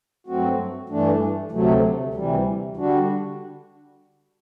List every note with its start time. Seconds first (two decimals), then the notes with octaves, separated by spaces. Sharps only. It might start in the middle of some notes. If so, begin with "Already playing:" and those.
0.27 G2 F#3 A3 C4 F#4
0.89 G2 E3 A3 D4
1.51 D2 C3 F#3 A3
2.14 D2 C3 E3 G3
2.77 D3 G3 D4 F#4